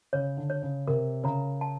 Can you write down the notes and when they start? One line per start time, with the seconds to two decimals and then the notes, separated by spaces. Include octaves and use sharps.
0.13 C#3 C#5
0.37 D3
0.50 C#5
0.63 C#3
0.88 C3 A#4
1.24 C#3 A#5
1.61 A5